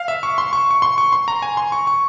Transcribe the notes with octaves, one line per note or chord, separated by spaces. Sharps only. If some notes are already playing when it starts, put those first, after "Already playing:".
Already playing: F5
E5
C#6
C6
C#6
C#6
C6
C#6
C6
A#5
G#5
C6
C#6
C#6